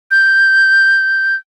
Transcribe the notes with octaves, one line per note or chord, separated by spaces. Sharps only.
G6